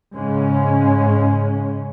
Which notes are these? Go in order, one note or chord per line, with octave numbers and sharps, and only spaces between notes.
G#2 C#3 G#3 C#4